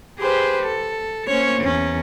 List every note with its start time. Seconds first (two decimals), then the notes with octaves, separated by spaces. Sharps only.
0.18 G4 G#4 B4 C5
0.62 A4
1.28 A#3 C#4 C5 C#5
1.62 E2 C#4